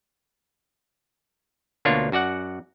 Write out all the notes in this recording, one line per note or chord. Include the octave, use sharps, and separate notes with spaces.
D2 B2 A#3 D4 F4 C#5
F#2 F#4 D5 F#5